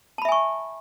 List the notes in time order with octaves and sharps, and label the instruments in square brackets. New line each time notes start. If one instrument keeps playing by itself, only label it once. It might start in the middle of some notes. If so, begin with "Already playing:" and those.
[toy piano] A5
B5
E5
G#5
C#6